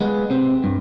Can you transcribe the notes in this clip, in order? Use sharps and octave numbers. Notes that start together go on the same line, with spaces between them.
G#3 B3
C3 C4
G2